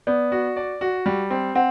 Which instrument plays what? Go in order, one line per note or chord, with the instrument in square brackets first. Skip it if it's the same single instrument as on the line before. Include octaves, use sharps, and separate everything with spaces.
[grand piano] B3 [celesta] D5
[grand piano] F#4
D5
F#4
G3
C4
[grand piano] C4 [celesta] F#5